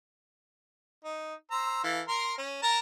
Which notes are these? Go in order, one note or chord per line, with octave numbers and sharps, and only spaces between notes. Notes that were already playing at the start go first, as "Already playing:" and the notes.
D#4
C5 A#5 E6
E3 A4 F5
A#4 A#5 C6
C#4
A#4 A5 A#5